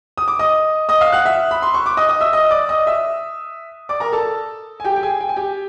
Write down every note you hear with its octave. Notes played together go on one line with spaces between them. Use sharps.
D#6
D6
D#5 D#6
D#5 D#6
F5 F6
F#5 F#6
E5 E6
B5
C6
C#6
D6
D#5 D#6
D#5 D#6
E5 E6
D#5 D#6
D5 D6
D#5 D#6
E5 E6
D5 D6
A#4 A#5
A4 A5
G#5
G4 G5
G5
G#4 G#5
G5
G#5
G4 G5